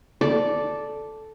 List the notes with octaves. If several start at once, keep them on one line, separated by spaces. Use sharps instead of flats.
A4 D5 D6